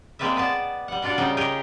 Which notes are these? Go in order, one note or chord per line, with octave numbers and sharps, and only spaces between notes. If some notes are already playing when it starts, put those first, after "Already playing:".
G#3 A#3 C4 B4 D5 E5
B3 B4 D5 A5
G3 F#5
B2 D4 F4 D5 F#5
C#3 G3 D#4 G5
G4 G#4 A#4 C#5 D#5 G5